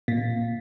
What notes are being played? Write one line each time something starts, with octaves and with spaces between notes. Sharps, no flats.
A#2